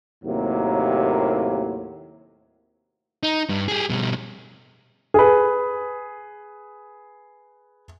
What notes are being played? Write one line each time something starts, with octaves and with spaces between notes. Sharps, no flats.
D#2 A2 C3 F#3 A#3
D#4
G2
G4 G#4
B2 G3
G#4 B4